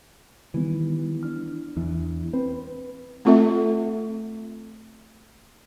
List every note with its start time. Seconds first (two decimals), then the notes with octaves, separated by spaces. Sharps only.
0.54 D#3 E3 G3 B3
1.23 D4 F6
1.77 E2 E3 D4
2.33 C4 B4
3.25 A3 C4 F4 A4 E5